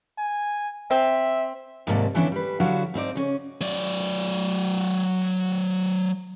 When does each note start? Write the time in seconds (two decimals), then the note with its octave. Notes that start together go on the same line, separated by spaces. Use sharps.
0.18 G#5
0.91 C4 E5
1.87 D#2 G#2 C3 A#3 D5 A5
2.15 D3 E3 B3 C#4 D4 E4
2.32 G3 B4
2.60 D3 F#3 D4 E4 F#4 F5
2.94 G#2 C4 D#4 D5
3.15 C#3 C#4
3.61 F#3 D5